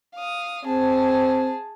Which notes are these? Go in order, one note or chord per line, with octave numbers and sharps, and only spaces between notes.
F5 D#6
C4 G#4 A5